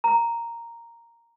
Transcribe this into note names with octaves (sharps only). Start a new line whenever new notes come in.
A#5